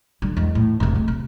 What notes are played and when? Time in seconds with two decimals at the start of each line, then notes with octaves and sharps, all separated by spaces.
0.22 D3 G3
0.37 E2 G#3
0.55 A2
0.80 E1 C3
0.96 A3
1.08 C3